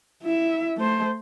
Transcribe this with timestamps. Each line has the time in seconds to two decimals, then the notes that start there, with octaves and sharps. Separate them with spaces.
0.23 E4 E5
0.77 A3 C5